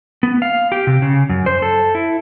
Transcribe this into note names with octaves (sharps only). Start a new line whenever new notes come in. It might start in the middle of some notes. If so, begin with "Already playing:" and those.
B3
F5
G4
C3
C#3
F#2
C5
A4
E4